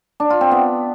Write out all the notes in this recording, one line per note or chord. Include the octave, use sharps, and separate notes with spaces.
D4
F4
C4
B3